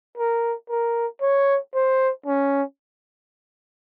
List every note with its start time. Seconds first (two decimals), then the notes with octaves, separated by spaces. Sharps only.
0.18 A#4
0.70 A#4
1.22 C#5
1.74 C5
2.26 C#4